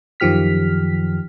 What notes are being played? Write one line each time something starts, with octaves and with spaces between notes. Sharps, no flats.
F#2 D#3 F3 G4 F6 B6